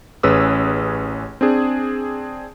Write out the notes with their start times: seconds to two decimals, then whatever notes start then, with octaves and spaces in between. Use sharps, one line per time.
0.23 A1 C#4 G#4 B4 D#6 E6
1.41 C4 D4 G#4